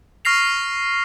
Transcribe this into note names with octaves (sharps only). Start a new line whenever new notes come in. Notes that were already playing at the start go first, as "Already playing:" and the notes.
C#6 F6 A#6 C7 F7